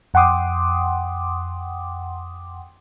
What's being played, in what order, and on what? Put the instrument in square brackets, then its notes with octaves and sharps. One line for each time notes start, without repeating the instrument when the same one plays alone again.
[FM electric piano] F2 F#5 G5 C6 D6 D#6